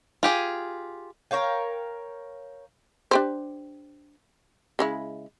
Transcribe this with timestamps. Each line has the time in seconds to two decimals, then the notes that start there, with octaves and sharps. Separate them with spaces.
0.23 F4 G4 G#4
1.31 A#4 C#5 F5 G5
3.11 D4 G4 C5
4.79 C#3 G#3 E4